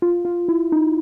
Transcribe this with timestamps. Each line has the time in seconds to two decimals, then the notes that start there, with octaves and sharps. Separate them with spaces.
0.02 F4
0.25 F4
0.48 E4
0.72 D#4